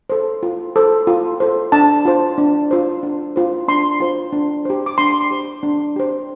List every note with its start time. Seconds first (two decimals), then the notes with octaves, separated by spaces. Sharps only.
0.10 A4 C5
0.43 F4
0.76 A4 C5
1.07 F4
1.40 A4 C5
1.72 D4 A5
2.05 F4 C5
2.38 D4
2.71 F4 C5
3.03 D4
3.36 F4 C5
3.68 D4 C6
4.00 F4 C5
4.33 D4
4.65 G4 C5
4.86 D6
4.98 D4 C6
5.31 G4 C5
5.63 D4
5.96 G4 C5